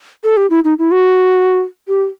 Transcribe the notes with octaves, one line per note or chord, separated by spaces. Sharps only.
A4
G4
E4
D#4
E4
F#4
G4